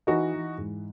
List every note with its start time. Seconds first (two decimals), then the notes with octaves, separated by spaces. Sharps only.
0.07 E3 D#4 F#4
0.34 E3
0.58 G#2